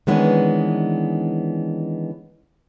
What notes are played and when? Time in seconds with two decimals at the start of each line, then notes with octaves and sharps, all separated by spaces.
0.07 D#3 E3 G#3 B3 C#4 D4